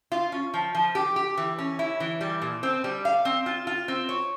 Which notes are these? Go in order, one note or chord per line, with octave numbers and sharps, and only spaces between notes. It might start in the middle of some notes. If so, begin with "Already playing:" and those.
F4
C#4
F3
F3
G4
G4
E3
C#4
E4
E3
G3
A#2
C4
G3
F5
C4
F4
F4
C4
C#5